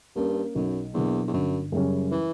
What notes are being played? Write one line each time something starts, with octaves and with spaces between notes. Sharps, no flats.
G2 A#3 C#4
B1 F#2
E2 B2 F#3 A#3 D4
E2
G1 F#2
F#2 C#3 G3 C#4
E3